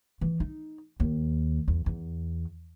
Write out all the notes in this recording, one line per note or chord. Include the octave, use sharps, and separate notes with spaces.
E3
D#4
D#2
E2
E2